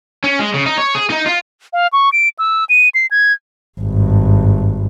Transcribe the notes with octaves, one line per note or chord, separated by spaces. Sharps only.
C#4
G#3
C#3
D#4
C#5
G#4
D#4
F4
F5
C#6
D7
E6
D#7
C7
G#6
G#1 G2